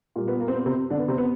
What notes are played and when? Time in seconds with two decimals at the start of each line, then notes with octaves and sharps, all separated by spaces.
0.16 A#2 G3
0.28 B3
0.40 A#3
0.48 C4
0.53 B3
0.66 C3 C4
0.90 D3 D4
0.99 B3
1.08 C3 C4
1.18 B3